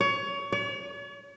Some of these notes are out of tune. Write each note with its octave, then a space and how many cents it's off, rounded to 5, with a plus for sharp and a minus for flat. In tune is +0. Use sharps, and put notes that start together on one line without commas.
C#5 +25
C#5 +45